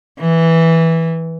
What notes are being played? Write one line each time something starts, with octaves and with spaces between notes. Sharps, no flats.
E3